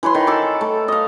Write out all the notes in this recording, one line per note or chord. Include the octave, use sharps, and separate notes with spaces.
E3 B4 C#5 C6
D#3
A4 A5 B5 D6
A3
D#5 F5